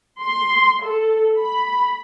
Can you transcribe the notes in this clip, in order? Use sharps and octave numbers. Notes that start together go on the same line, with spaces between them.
C6
A4
B5